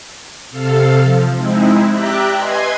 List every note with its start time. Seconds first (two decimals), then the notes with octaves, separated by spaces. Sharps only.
0.50 C3 A4 F5
1.00 F3
1.35 G#3 C4 D#4 E4
1.87 G4 D5 E5 G5 A#5 F#6
2.33 B4 D#5 G#5 C6 G#6